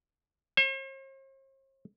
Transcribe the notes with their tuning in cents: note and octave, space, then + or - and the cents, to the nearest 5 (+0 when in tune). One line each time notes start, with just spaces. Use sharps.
C5 +45